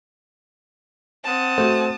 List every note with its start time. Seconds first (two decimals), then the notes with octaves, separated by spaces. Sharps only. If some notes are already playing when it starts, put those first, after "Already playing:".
1.24 C4 F#5 A5 D#6
1.58 A3 F#4 C5